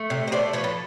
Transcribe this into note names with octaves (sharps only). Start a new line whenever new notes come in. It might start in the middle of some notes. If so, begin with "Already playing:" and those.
Already playing: A3
C3
D#5
A3 C5 D5
F3 B4 C#5
A4 B4